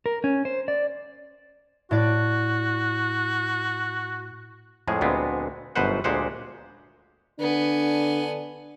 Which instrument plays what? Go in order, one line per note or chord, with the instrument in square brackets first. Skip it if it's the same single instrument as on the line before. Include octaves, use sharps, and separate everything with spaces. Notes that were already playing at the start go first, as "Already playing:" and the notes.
[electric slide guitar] A#4
C#4
C5
D5
[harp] A2 D5 A6 [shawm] F#4
[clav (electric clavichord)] F2 A2 F3 G#3 G#4
D2 A#2 G#3 B3 C4
G1 F#2 B2 B4 C5 F#5
D2 A#2 G#3 G4 C5 F#5
[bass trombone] D3 [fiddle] B3 G#5 [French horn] D4